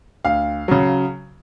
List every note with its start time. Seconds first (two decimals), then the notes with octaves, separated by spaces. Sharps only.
0.25 D2 F5
0.68 C#3 F#3